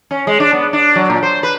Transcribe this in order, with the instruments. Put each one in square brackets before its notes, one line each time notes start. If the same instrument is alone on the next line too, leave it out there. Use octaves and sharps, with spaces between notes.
[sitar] C#4
G#3
D4
B3
D4
F#3
A#2
C5
B4